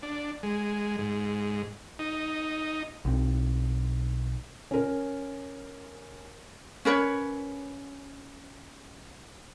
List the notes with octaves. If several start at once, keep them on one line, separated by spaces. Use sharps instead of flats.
D4
G#3
G#2
D#4
B1 C4
C#4 A#4
C#4 A#4 B4 C#5